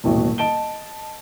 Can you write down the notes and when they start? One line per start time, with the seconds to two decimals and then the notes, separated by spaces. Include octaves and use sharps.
0.04 D#1 A1 B2
0.38 D#5 A5 D7 G7